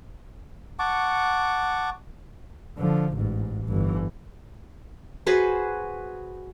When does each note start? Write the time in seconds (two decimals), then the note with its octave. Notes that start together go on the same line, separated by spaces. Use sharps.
0.79 F#5 A5 C#6 D6
2.77 D3 F3
3.14 A1 G#2
3.67 G1 E3
5.26 F#4 G#4 B4 C5